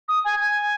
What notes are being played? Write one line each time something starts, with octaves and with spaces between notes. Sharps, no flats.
D#6
G#5
G#5